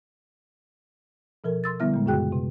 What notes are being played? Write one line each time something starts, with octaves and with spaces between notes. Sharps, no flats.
B2 F3 A4 A#4
C6 E6 A6
D3 G3 B3 E4 E5 F6
A#2 G#3
F#2 C#3 F#4 G#4 G5 F#6
C3